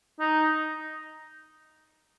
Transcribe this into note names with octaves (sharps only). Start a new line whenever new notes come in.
D#4